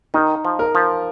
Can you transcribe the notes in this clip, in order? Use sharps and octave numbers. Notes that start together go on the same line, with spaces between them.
D#3 D#4
F3
A#4
F3